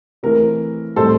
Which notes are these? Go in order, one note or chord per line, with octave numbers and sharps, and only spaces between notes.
E3 A3 C4 A#4
A2 G3 C4 A4 C5